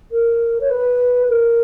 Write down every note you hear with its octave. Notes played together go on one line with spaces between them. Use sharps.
A#4
C#5
B4
A#4